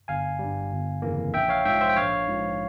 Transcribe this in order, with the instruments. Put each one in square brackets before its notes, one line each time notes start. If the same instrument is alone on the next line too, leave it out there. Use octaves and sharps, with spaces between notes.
[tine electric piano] G1 F5 G#5
G2 G3
G1
F2 C#3 E3 A#3
A#1 E5 G5
C#5 F5
G#2 F3 E5 G5
C5 E5
G5
A#1 C#5 F5
G#2 F3